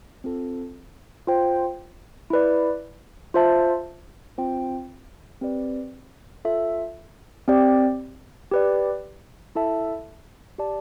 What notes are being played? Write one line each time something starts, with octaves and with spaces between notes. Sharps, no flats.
C4 F4 A4
F4 C5 G5
E4 B4 D5
F4 C5 E5 A5
C4 F4 C5 G5
C4 G4 B4 D5
F4 A4 E5
C4 G4 D5 G5
G4 B4 D5
E4 A4 E5 A5
G4 D5 A5